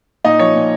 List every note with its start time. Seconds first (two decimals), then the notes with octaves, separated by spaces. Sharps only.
0.24 A#2 D#4 D#5
0.39 F3 C#5
0.55 A#2